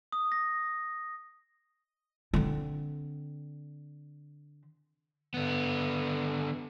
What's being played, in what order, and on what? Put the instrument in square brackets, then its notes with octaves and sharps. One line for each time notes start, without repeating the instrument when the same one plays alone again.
[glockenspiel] D#6
A#6
[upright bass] D3 C4
[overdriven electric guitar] D3 B3